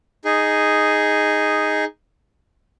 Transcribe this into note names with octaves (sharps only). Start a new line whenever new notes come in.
D#4 G#4